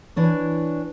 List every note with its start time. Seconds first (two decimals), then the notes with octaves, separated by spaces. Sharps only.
0.16 E3 D4 C#5